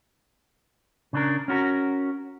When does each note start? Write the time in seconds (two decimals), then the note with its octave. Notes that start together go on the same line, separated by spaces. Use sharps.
1.13 C#3 D4 A#4
1.48 C#4 F#4 A#4